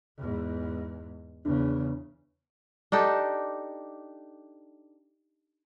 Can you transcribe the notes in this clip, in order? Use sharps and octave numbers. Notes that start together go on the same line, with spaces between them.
E2 G#2
E2 C#3 D4
D4 D#4 G4 A4